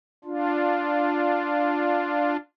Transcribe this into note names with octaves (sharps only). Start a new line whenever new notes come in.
D4 F4